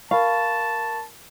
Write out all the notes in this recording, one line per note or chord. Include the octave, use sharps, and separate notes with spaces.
A#4 F5 A5 B5 C#6